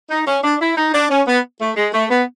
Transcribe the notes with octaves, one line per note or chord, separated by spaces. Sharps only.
D#4
C#4
D4
E4
D#4
D4
C#4
B3
A3
G#3
A3
B3